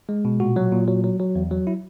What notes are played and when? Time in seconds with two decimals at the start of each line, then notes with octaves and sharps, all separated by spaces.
0.09 G#3
0.25 B2
0.40 A#2 F#4
0.56 F#3
0.72 A#2
0.88 F#3
1.04 F#3
1.20 F#3
1.35 E2
1.51 F#3
1.67 E4